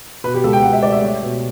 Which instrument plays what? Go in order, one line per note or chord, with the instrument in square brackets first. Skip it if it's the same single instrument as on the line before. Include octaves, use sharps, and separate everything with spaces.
[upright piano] B2 B4
G4
C#2 A4
G5
C#2 F#5
E5
A3 D5
E5
G3 C#5
B2